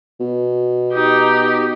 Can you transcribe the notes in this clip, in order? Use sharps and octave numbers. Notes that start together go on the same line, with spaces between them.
B2
D#4 G4